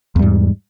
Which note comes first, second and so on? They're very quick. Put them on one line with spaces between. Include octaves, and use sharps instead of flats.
E2 G3 G#2